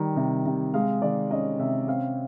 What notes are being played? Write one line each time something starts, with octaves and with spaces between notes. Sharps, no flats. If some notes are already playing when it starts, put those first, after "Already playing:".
Already playing: D#3 G3
C3
C3
G#3 F5
D#3 D5
C#4 D#5
C3 E5
C4 F5